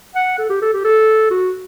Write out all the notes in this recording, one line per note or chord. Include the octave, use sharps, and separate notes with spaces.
F#5
A4
G4
A4
G4
A4
F#4